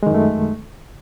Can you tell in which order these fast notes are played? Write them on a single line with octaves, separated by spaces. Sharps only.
G#3 D#3 F#2 A3